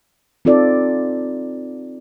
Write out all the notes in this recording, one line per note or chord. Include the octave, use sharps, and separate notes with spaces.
C4 D#4 F4 A4 D5